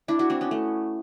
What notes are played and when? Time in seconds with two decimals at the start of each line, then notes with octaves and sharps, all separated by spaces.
0.08 D4 E4
0.19 E4 F#4
0.30 C4 D4
0.41 B3 C#4
0.51 A3 B3